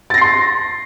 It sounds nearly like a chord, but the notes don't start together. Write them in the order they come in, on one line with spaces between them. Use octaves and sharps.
A6 A#6 C7 C6